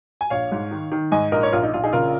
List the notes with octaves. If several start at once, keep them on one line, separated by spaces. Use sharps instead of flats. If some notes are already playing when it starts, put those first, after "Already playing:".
G#5
A#1 C#5 F5
G#2
D#3
D#3
G#2 D#5 G#5
A#1 A#4 D#5
C#5
A#1 F4 A#4
D#4
A#1 F4
D#4 G#4
C#3 F4 A#4